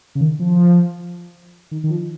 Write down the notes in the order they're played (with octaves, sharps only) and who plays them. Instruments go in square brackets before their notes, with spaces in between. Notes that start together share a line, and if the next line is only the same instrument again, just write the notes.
[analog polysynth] C#3
D#3
F3
D#3
D#3
F3